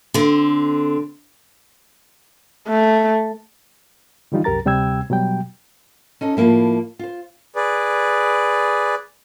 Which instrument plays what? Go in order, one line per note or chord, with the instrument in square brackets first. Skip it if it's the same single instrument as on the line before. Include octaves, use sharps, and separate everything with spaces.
[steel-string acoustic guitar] D3 C4
[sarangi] A3
[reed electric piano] D3 E3 G3 D#4 F4
C2 F#2 G4 A#4 A#5 A6
D2 C3 G3 G5 E6 G#6
B2 F#3 G3 G5
[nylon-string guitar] C#4 D#4 A4
A2 F3 G#3 A#3 E4
F4 C5
[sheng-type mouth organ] G#4 B4 D5